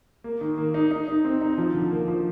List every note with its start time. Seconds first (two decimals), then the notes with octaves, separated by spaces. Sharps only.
0.24 A#3
0.41 D#3
0.58 A#3
0.74 D#4
0.91 D#4
1.07 D#4
1.25 C4
1.41 D#4
1.58 F3
1.74 D3
1.91 A#3
2.08 F3